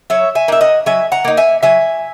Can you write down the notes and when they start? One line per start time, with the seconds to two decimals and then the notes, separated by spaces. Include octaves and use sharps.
0.10 F#3 C#5 E5
0.35 E5 G#5
0.48 A#3 D#4 E5
0.61 D#5 F#5
0.86 F#3 E5 G#5
1.12 F#5 A#5
1.25 A#3 D#4
1.37 E5 G#5
1.63 F#3 E5 G#5